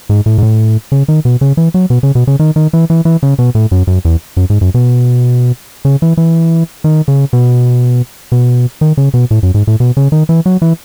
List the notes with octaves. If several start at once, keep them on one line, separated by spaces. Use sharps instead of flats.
G#2
A2
G#2
A2
C#3
D#3
B2
C#3
E3
F#3
B2
C#3
B2
C#3
D#3
D#3
E3
E3
E3
C#3
B2
A2
F#2
F#2
E2
F#2
G#2
F#2
B2
C#3
E3
E3
D#3
C#3
B2
B2
D#3
C#3
B2
A2
F#2
G#2
A2
B2
C#3
D#3
E3
F#3
E3